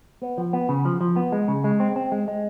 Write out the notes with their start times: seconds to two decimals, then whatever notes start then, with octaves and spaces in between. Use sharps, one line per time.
0.22 B3
0.38 F3
0.53 B3
0.69 C#3
0.85 F3
1.01 F3
1.16 B3
1.32 G#3
1.48 C#3
1.64 G#3
1.80 C4
1.96 C4
2.12 G#3
2.28 G#3